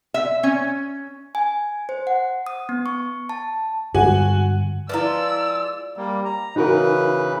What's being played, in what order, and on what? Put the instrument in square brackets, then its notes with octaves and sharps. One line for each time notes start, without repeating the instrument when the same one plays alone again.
[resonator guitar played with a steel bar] E5
C#4
[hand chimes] G#5
C5
F#5
D#6
B3
C#6
A5
[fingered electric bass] G2 D3 G#3 [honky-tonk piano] F#4 G#5
[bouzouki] F3 G#3 F4 [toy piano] E4 B4 [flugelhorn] D5 [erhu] E6
[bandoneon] G3 A#3
A#5
[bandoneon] C#3 E3 B4 [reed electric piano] D#4 F#4 A#4